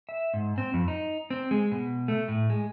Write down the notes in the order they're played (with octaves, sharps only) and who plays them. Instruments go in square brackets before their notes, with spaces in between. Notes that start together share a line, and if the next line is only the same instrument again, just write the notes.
[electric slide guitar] E5
G#2
C4
F2
D#4
C4
G#3
B2
A3
A2
G#3